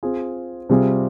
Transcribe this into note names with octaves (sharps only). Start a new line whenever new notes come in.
C4 F4 G#4
C3 G3 C4 F4 G#4